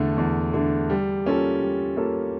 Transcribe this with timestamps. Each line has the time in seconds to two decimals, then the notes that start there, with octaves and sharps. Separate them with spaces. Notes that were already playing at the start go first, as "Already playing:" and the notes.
Already playing: E2 D3 A3
0.18 E2
0.54 D3 A3
0.90 G3
1.25 A#3 C#4 F4 A4
1.61 G3
1.96 A#3 C#4 F4 A4